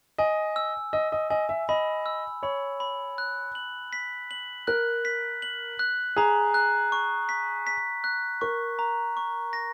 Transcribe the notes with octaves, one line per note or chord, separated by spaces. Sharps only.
D#5 G#5
E6
D#5 E6
D#5
D#5 G#5
E5
D#5 B5
E6
C#5 B5
B5
F#6
F#7
B6
F#7
A#4 F#6
B6
F#7
F#6
G#4 A#5
F#6
C#6
B6
B6
F#6
A#4 C#6
A#5
C#6
A#6